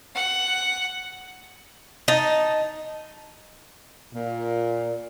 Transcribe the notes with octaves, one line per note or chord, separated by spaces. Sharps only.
F#5
D#4 A5
A#2